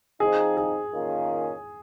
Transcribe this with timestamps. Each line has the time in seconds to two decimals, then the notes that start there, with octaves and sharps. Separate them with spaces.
0.20 F3 C4 D#4 G#4
0.57 G#4
0.94 D#3 A#3 C#4 F4